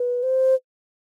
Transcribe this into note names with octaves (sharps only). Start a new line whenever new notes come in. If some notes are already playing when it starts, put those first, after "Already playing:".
Already playing: B4
C5